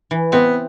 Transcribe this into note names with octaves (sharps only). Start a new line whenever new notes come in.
E3
B3 C4